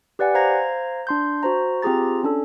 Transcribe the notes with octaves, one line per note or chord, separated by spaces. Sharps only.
G4 B4 D5 F#5 G#5
C5 F5 A#5 G#6 A#6
D4 C6 G6
F#4 C5 A#5
C4 F4 G4 G#4 A#5 A6
C#4 D4 A4